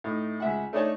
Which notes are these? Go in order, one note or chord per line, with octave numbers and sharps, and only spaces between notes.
A2 D#4
C#2 E5 F#5
A3 D4 D#4 A4 C#5 A5